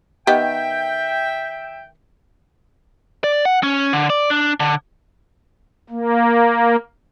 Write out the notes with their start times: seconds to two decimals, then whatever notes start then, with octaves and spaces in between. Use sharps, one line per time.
0.27 D#3 B3 G4 E5 G5
3.24 D5
3.45 F#5
3.63 C#4
3.93 D3
4.10 D5
4.30 D4
4.60 D3
5.90 A#3